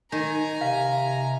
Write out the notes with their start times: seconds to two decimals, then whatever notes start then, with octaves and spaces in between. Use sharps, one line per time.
0.12 D#3 D#4 G#5 A#5
0.61 C3 F5